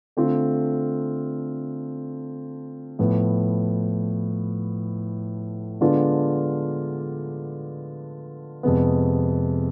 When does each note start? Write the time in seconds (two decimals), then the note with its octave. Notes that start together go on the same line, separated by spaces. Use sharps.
0.17 D3 A3 C4 F4
2.99 A2 F3 B3
5.81 D3 G#3 B3 D4 F4
8.63 F2 C3 G#3 B3